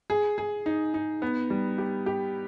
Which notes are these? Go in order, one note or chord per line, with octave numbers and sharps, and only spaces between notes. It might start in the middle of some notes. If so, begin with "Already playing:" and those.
G#4
G#4
D#4
D#4
B3
G3
G4
G4